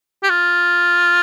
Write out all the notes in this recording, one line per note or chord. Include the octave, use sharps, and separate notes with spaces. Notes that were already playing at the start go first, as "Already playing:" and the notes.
G4
F4